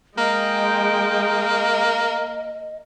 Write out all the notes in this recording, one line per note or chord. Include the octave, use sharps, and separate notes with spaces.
G#3 A#3 D#5 G5